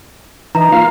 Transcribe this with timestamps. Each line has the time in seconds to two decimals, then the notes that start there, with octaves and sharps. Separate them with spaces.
0.55 E3 D#4 A#5
0.72 A#3 F4 F5